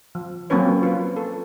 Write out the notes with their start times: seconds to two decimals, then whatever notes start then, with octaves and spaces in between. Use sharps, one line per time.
0.15 F3
0.50 F#3 A#3 C4 C#4 B4 C#5
0.83 F4 B4
1.16 A4